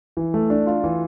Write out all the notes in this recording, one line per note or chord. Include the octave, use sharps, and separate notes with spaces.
E3
A3
D4
F4
E3